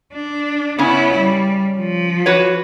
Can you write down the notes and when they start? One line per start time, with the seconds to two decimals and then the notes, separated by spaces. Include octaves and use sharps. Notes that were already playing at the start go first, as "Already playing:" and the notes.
0.13 D4
0.78 C#3 B3 C#4 E4
1.18 G3
1.79 F3
2.26 F#4 B4 C#5